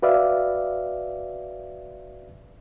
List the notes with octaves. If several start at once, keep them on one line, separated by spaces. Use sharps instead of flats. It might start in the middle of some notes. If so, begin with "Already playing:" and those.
F#4 B4 D5 E5 F5